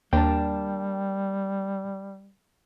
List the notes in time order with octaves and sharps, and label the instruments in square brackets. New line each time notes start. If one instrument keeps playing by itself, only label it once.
[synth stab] D#2 [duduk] G3 [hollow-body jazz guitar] A#3 D4 [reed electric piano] G5 A5